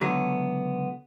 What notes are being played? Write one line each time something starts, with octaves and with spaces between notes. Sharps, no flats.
C#2 D3 F#3 A3 B3